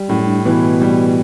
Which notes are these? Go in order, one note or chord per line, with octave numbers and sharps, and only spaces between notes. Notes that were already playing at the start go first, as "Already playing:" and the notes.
Already playing: G3
F#2 A2
G2
B2 E3
G3